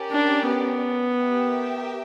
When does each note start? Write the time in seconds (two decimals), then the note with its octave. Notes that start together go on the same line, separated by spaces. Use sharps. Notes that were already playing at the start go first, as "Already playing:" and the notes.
Already playing: C#4 G4 A#4 D5
0.12 D4
0.47 B3
1.19 G4 A#4 E5 G5